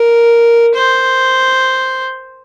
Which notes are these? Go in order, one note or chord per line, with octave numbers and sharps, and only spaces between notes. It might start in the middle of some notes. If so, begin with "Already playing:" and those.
Already playing: A#4
C5